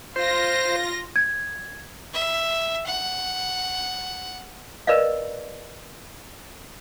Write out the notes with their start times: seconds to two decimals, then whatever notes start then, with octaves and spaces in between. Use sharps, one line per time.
0.16 F4 C5 A#6
1.16 G#6
2.14 E5
2.87 F#5
4.87 A#4 B4 D5 D#5 F5